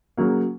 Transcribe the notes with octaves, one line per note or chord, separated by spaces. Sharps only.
C#3 F#3 A#3